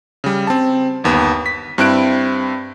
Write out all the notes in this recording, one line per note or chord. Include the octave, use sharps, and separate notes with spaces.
C#3 G3
C4 A5
G1 D#2 B3
B6
G2 C4 E4 F#6 D7